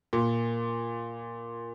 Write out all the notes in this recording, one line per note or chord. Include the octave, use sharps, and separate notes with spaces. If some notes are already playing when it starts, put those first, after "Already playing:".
A#2